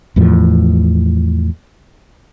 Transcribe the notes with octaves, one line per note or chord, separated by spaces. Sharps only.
E2 A2 F3